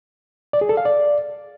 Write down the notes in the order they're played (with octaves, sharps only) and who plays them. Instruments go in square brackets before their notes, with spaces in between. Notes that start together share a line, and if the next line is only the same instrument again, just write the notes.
[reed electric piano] D5
G#4
A4
F5
D5